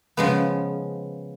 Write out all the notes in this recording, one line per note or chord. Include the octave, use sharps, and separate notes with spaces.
C#3 F3 G#3 B3